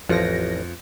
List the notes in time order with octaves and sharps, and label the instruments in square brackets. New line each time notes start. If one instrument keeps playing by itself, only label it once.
[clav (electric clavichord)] A1 [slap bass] F2 [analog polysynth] F3 A#6